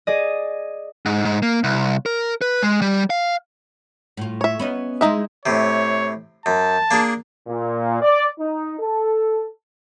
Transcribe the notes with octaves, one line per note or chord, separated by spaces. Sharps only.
G#4 D5 D#5
G#2
G#2
A#3
C2
A#4
B4
G#3
G3
F5
A2 F4
C#5 E5
B3 C#4 D#4
G#3 D#4 E4 E5
A2 C3 C#5
F#2 A5
A#3 D4 G#4
A#2
D5
D#4
A4